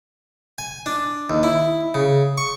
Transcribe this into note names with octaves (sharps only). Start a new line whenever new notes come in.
G#5
D4
D#2
E4
C#3
C#6